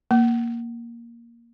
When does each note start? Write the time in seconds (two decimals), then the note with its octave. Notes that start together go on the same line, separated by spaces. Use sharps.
0.11 A#3